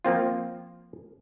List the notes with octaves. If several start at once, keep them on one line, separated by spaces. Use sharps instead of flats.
F3 A#3 C4 F4